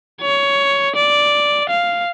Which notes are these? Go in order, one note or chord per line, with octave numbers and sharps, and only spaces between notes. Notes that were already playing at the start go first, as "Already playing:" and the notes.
C#5
D5
F5